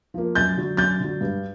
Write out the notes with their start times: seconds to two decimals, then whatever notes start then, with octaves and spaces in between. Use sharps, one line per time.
0.14 F3 A#3
0.35 F#2 G6 A6
0.57 D3 F#3
0.77 F#2 G6 A6
0.99 D3 F#3
1.21 G2